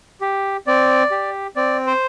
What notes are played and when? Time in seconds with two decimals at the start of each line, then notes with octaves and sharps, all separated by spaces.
0.21 G4
0.67 C4 D5
1.11 G4
1.56 C4 D5
1.87 C5